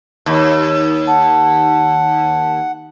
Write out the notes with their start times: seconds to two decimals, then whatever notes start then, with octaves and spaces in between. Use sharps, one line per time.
0.26 D#2
1.07 F#5 A5